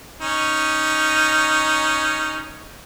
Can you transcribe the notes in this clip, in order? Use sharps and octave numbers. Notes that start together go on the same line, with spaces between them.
C#4 D#4